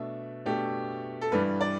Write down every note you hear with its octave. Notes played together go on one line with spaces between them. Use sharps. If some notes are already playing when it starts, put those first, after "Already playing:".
Already playing: B2 A3 D4 E5
B2 A3 D4 G4
A4
G2 E3 G3 D4 B4
D5